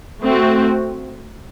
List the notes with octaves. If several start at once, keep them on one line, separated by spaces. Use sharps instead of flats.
A3 C4 F#4